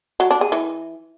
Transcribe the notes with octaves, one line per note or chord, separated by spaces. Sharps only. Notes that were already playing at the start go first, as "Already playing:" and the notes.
F#3
D4
G#4
E3